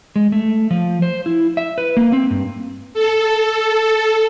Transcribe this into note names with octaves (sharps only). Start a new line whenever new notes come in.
G#3
A3
F3
C5
E4
E5
B4
A#3
C4
G2
A4